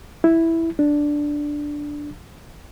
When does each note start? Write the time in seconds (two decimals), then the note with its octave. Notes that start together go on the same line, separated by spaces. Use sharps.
0.24 E4
0.79 D4